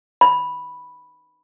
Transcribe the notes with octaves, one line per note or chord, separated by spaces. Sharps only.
B5